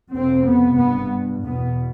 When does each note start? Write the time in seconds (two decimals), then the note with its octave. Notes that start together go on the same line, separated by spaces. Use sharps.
0.12 F2 C3 C4
0.46 B3
0.77 G2 B3
1.42 E2 B2 B3